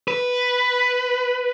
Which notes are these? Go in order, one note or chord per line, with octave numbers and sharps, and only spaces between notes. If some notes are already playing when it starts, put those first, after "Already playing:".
B4